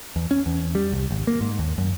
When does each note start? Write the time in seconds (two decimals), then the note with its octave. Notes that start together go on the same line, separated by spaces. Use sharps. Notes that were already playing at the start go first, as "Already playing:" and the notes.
0.16 E2
0.31 C#4
0.46 E2
0.75 G3
0.92 C2
1.11 G#1
1.27 A#3
1.41 G#2
1.59 D#2
1.78 F#2